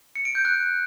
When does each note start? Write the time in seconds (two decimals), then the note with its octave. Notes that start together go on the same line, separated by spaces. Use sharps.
0.15 C#7
0.25 D7
0.35 G6
0.45 F#6